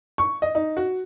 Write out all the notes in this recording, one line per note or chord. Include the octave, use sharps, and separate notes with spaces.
C#6
D#5
D#4
F#4